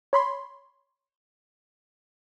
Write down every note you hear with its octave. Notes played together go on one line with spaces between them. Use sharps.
C#5 B5 C6